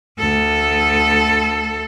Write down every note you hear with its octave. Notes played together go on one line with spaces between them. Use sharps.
D2 A4